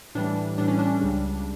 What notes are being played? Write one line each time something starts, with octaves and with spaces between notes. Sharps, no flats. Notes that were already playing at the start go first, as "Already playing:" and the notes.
A2 E3 G3 D4
A2 E3 G3 D4
C#4
D4
C#2 C#3 G3